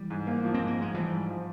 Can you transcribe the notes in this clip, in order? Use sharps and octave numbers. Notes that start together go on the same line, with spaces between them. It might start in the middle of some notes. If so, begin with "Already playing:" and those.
Already playing: E3 G3
G#2
A#3
F3
C4
G#2
A#3
G#2 G#3
E3 F3 G3
G#2
F3